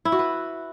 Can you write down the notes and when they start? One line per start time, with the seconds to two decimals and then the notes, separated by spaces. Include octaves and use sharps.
0.05 E4
0.12 F#4
0.19 B4